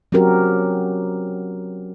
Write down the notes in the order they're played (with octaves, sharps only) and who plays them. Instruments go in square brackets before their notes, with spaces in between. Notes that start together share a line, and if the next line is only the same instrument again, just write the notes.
[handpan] F#3 C4 C#4 F#4 G4 A#4